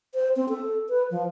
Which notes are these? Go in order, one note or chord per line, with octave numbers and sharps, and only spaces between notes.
C5
C4
A4
B4
F3